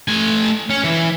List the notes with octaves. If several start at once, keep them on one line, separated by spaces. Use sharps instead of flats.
A3 G#5
C#4
E3